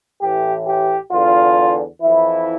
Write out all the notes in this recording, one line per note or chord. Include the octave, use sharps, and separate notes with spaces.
A1 A2 E3 G4
G4
E2 D3 F4
F2 E3 E4